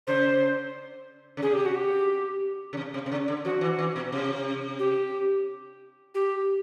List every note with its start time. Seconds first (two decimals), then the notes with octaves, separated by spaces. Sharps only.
0.07 C#3 C5
1.37 C#3
1.42 C3 G#4
1.53 G4
1.66 F#4
1.76 G4
2.73 C#3
2.77 C3
2.94 C3
3.06 C3
3.11 C#3
3.28 D3
3.45 F3 F#4
3.61 E3
3.79 E3
3.96 B2
4.12 C3
4.79 G4
6.15 G4